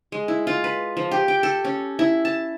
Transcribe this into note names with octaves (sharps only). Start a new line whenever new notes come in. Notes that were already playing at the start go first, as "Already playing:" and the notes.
G#3
E4
F4
B4
F3
G4
G5
A4
C#4
E4
A5